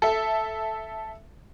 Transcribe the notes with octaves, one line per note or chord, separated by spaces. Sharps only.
A4 E5